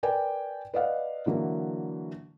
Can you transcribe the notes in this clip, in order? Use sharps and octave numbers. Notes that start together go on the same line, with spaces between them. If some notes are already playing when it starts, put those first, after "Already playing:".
A#4 B4 D5 G5 G#5
B4 D5 D#5 F5 F#5
D3 E3 F#3 A#3